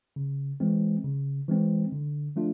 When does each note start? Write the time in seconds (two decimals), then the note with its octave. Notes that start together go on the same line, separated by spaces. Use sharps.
0.16 C#3
0.60 E3 G#3 C4
1.05 C#3
1.48 E3 G#3 C4
1.92 D3
2.36 F3 A3 D4 F4